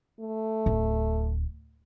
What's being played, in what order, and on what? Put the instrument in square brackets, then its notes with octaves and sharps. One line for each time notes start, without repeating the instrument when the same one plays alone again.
[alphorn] A3
[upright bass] D1